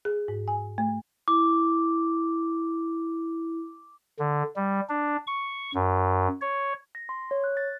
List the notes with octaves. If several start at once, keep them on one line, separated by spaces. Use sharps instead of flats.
G#4
G#2
G#5
A3
E4 D6
D3
G3
D4
C#6
F#2
C#5
A#6
C6
C#5
F#6
A6